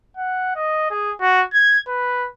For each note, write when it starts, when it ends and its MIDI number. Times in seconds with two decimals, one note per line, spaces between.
0.17 0.54 78
0.56 0.89 75
0.90 1.11 68
1.21 1.42 66
1.53 1.78 92
1.88 2.27 71